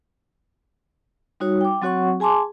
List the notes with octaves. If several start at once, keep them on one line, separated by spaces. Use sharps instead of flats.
G3 D#4 F#4 C#5
G5 D6
F#3 C4 F#4 C#5 F#5 C#6
G#4 G#5 A5 C6 D6